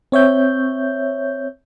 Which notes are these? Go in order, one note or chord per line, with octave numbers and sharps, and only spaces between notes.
C4 C#5 E5 G6